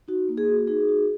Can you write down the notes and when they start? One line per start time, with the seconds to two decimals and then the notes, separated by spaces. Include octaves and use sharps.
0.08 D#4 F#4
0.29 A#3
0.38 G#4
0.48 F#4
0.67 D#4 G#4
0.88 F#4